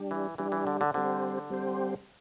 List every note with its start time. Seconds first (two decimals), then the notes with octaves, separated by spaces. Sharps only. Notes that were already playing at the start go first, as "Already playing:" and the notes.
Already playing: G3 D4 G4
0.11 E3
0.38 E3 G3 D4 G4
0.52 E3
0.67 D3
0.81 D3
0.94 D3 G3 C4 G4 C5
1.50 G3 C4 G4 C5